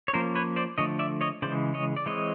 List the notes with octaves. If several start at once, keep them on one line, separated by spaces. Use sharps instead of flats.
C#5
F3 A#3 C#4 A#4 C5
B4 C#5
C5 D5
D3 F3 A3 C#5 D#5
D5 E5
C#5 D#5
C#3 E3 G#3 C5 D5
C#5 D#5
D5
E3 G#3 C4 C#5 D#5